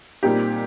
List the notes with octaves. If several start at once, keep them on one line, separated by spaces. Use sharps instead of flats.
A#2 G3 C4 D#4 G4